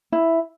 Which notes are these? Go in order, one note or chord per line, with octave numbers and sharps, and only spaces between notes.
E4